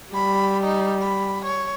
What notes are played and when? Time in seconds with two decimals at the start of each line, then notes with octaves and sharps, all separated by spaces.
0.14 G3 B5
0.64 D#4
1.02 B5
1.46 C#5